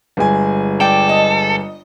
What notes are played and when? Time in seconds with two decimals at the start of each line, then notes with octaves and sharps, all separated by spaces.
0.17 G1 G#3 G#5
0.80 A4 D5 G5
1.09 D#5